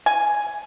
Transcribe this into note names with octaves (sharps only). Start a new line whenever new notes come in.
G#5